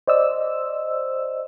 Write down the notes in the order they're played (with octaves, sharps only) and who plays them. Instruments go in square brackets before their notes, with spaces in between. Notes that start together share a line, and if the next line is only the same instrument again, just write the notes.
[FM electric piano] C5 D5 D#5 E6